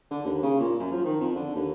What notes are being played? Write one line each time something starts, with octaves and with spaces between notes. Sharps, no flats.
D3
D#2
C#3
A#2
F#2
F3
D#3
F2
D3
D#2